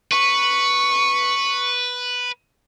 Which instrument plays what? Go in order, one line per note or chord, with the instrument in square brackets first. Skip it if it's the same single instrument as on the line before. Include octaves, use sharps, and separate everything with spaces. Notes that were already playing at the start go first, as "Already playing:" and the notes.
[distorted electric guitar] B4 [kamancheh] C#6